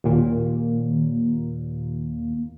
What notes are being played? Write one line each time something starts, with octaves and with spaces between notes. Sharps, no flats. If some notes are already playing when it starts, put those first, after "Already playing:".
D#2 A#2 A#3